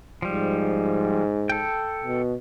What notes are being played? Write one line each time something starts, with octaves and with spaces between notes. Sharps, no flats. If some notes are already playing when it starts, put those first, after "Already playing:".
G#2 F3 G3
A4 G5
B2